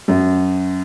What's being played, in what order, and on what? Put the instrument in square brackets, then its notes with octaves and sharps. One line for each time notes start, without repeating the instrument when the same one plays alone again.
[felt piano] F#2